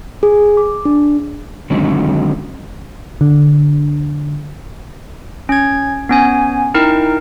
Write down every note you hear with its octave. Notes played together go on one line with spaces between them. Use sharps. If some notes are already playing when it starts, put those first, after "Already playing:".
G#4
D6
D4
D3 D#3 F#3 G#3 C4 C#4
D3
C#4 G#6
B3 C#4 G#5
D#4 E4 A#4 G5